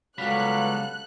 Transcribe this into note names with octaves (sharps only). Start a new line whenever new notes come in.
C#2 F#3 G3 B3 A4 F5 B5 F#6